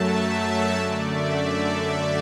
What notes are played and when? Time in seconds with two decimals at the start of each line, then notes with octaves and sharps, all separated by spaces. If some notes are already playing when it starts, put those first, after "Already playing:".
Already playing: F#2 F#3 A3 E5 A5
0.17 E5
0.78 F#2 D3 A3 D5
1.08 E5